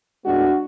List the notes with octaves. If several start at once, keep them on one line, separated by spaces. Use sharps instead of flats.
A2 G#3 B3 D4 F#4